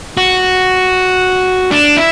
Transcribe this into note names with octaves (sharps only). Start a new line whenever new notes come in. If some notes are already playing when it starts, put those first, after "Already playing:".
F#4
D4
E4